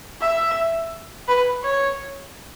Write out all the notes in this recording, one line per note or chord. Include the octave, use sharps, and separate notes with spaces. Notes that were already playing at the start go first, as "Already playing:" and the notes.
E5
B4
C#5